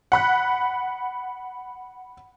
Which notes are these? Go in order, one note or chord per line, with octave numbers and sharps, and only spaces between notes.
F#5 B5 F#6